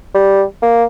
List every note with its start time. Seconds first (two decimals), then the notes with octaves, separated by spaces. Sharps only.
0.15 G3
0.62 A#3